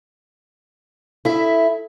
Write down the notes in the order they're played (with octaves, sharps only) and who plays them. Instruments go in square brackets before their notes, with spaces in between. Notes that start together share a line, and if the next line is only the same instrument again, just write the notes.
[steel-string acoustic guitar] E4 E5 [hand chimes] A4